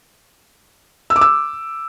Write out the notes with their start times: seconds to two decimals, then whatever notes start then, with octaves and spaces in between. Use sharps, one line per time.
1.10 E6
1.16 D6
1.21 E6